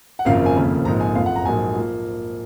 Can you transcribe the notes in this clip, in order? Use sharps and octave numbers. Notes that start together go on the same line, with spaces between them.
F#5
G#1 F#2 C#3 F3 A#3 F5
G#5
F1 D#2 C#3 F3 A#3
A#1 G#2 F3 A#3 A#5
G#5
F#1 F2 F3 F5
F#5
A#5
A#1 G#2 F#3 A#3 G#5
F3 A#3